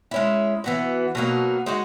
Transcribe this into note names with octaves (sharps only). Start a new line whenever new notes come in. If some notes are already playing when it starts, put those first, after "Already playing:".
G#3 C#4 E4
E3 B3 F#4
B2 F#3 A#3 D#4
G#3 D#4 F#4